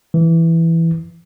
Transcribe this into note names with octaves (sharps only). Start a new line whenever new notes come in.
E3